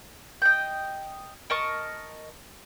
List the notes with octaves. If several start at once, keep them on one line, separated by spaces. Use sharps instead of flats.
D#5 G5
A#4 D#5 A5 C#6